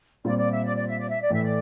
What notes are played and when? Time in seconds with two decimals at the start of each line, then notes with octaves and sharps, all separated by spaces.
0.25 A#2 G3 C4 F4 D5
0.38 D5
0.51 E5
0.65 D5
0.77 D5
0.88 E5
0.99 D5
1.10 E5
1.21 D5
1.30 A2 E3 A3 E4 E5
1.44 D5